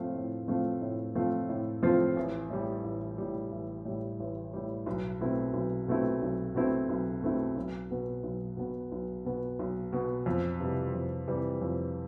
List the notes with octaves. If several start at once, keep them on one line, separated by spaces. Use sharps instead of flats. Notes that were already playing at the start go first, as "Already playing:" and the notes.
Already playing: A2 F3 A3 C4 F4
A2
F3 A3 C4 F4
A2
F3 A3 C4 F4
A2
F3 A3 C4 F4
A1
A2 G3
A1
A2 G3
A1
A2 G3
A1
A2 G3
B1
B2 A3 C4 E4
B1
B2 A3 C4 E4
B1
B2 A3 C4 E4
B1
B2 A3 C4 E4
B1
B2 B3
B1
B2 B3
B1
B2 B3
B1
B2 B3
F2
C3 E3 G3
F2
C3 E3 G3
F2